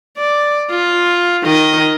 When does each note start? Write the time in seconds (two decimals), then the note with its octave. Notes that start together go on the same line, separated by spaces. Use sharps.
0.18 D5
0.70 F4
1.44 D#3 D#5